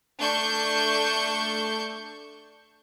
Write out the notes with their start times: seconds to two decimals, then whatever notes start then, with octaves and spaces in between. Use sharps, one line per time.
0.20 A3 D4 C#6 G6